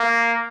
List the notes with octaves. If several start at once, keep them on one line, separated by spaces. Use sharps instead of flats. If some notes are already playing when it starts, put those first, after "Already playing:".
Already playing: A#3